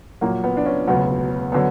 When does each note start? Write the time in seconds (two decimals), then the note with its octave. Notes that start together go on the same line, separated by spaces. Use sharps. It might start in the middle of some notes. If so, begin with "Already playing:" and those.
0.21 A#1 A#2 F#3 A#3
0.44 B3
0.57 D4
0.66 C#4
0.87 E1 D2 C#3 F#3 B3
1.52 D3 F#3 B3